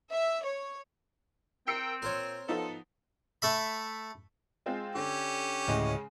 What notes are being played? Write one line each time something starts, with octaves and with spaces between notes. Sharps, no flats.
E5
C#5
C4 A#4 G5 E6 C7 C#7
A#2 A#4 C5 C#5
F3 B3 D#4 A4
A3 E5 B5
G#3 C4 F4
D3 C#4 G4
D2 A2 C#3 G#3 D#5